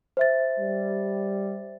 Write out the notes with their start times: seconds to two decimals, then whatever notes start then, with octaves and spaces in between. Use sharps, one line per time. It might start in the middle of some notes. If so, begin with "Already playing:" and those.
0.17 C5 E5 A6
0.58 G3